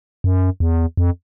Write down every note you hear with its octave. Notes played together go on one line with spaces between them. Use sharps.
F#2
E2
F2